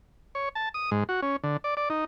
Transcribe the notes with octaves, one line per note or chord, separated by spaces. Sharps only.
C#5
A5
D#6
G#2
F#4
C#4
D3
D5
D5
D#4